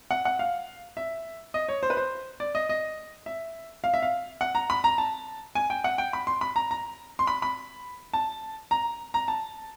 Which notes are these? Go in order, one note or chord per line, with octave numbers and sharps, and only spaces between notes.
F#5
F#5
F5
E5
D#5
C#5
C5
B4
C5
D5
D#5
D#5
E5
F5
E5
F5
F#5
A#5
B5
A#5
A5
G#5
G5
F#5
G5
B5
C6
B5
A#5
A#5
C6
B5
B5
A5
A#5
A#5
A5